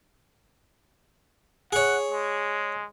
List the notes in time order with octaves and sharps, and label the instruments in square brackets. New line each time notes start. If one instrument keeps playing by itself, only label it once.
[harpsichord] G#4 C#5 [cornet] F#5
[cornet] G#3